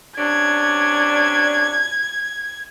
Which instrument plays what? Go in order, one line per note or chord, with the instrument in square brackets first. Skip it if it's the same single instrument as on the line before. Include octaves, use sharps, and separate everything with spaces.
[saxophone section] C3 C#4 D4 [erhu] G#6